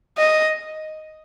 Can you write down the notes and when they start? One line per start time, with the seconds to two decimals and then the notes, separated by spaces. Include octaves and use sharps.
0.18 D#5